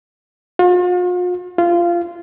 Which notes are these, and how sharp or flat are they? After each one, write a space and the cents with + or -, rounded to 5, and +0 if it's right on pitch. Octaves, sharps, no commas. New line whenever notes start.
F4 +45
F4 -15